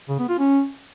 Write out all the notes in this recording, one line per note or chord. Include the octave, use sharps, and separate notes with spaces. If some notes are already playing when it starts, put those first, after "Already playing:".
C#3
B3
F4
C#4